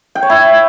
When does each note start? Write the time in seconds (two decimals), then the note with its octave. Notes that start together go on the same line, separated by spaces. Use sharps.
0.15 G5
0.23 C#5
0.30 E4